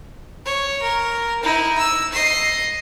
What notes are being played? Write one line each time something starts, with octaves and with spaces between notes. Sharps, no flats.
C#5
A#4
D#4 E4
E6
D#5 C7